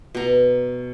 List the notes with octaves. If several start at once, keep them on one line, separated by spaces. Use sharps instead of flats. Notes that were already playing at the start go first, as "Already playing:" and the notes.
B2 A#5